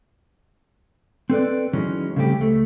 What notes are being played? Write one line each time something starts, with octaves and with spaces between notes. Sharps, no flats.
C4 A4 B4 D5
D#3 E3 F#3 G#3 C#4
C#3 G3 A3 C4 F#4 G4
C#2 A3